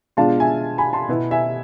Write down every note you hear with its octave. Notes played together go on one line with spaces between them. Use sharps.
B2 G#3 D4 F4 F5 A5
E5 G#5
G#5 B5
A5 C6
B2 B3 E4
E5 G#5